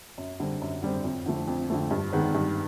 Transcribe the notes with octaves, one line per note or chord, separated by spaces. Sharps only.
F#2
D3 G3 C4
F#2
D3 G3 C4
F2
D3 F3 A3
F2
D3 F3 A3
G2
D#3 G#3 B3
G2